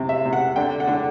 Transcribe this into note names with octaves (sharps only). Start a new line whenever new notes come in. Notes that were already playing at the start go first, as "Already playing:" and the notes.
Already playing: C3
E5
C3
F#5
D3 G5
F#5
D3